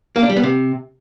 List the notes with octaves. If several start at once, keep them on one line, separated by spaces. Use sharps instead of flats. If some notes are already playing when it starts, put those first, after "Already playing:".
A#3
D4
G3
B3
C3